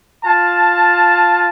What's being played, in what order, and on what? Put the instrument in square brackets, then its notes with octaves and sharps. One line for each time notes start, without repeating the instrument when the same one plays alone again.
[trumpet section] F4 A5